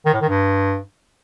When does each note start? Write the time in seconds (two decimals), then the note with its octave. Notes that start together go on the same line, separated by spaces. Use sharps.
0.06 D#3
0.13 A2
0.21 D#3
0.29 G2